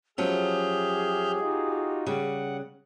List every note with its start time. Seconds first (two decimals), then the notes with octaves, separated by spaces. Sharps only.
0.18 F3 F#3 C#4 G4 G#4 E5 F6 G6
1.40 D#4 F4 F#4
2.06 C#3 G3 F#5